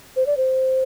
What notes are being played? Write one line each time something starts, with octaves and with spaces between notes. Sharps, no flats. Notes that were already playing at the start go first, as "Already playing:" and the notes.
C5
D5
C5